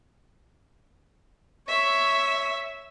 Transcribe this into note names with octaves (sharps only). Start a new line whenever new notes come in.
C#5 E5